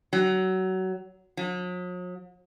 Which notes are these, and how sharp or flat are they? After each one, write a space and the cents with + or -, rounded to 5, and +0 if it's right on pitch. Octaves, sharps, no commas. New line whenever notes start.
F#3 +20
F#3 -45